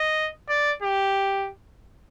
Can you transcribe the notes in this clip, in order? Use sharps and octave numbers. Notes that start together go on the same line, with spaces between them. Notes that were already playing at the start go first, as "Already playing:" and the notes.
Already playing: D#5
D5
G4